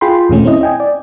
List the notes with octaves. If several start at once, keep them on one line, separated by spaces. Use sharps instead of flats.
F4 G#4 G5 B5 C6
D#2 A#2 D#3 G#3 A3 C#4
C4 C#4 E4 D#5
D#5 G5 G#5
D5